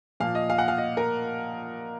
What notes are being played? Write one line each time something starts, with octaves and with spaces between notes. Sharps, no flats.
A#2 F3 A#3 F5
D#5
F5
F#5
F5
D#5
A#4